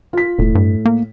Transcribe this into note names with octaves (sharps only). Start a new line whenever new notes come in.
F4 B6
E1 A2
G2
A#3